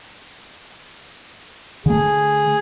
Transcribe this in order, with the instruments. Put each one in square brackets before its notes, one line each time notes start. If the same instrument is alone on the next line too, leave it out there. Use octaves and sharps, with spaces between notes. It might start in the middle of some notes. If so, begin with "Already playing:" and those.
[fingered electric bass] D3 A3 [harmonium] G#4